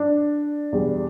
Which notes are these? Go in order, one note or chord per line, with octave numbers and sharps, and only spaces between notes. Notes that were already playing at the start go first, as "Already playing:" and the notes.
Already playing: D4
E2 B2 G3